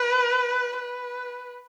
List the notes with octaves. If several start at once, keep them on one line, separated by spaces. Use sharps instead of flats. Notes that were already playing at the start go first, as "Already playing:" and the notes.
Already playing: B4
B4